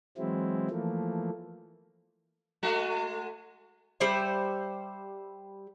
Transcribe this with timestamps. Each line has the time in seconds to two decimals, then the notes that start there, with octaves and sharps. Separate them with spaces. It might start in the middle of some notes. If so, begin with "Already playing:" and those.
0.18 E3 F#3 G#3 C4 E4
0.71 E3 F3 A3 A#3
2.63 G#3 A3 F#4
4.00 G3 G4 C5 E5